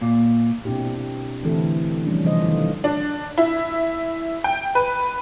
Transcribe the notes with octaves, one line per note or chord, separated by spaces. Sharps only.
A#2
B2 C4 D4 E4 G4
D3 E3 A3 C4 E4 A4
E3 F3 G3 A3 C#4 D4
C3 E3 G3 A4 C5 D#5
D#3 A3 F4
D4
E4
G5
B4